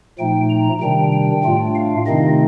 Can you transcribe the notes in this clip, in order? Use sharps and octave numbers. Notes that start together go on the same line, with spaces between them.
A#2 F3 A3 D#4 G5
A#5
C3 D#3 G3 D4 G5
G5
A2 A3 D4 F4
F5
C3 D#3 A3 C4 D#4 D#5